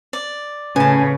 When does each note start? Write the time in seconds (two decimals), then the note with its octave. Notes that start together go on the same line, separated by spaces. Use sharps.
0.13 D5
0.76 A2 C#3 C#4 B4 G#5 A5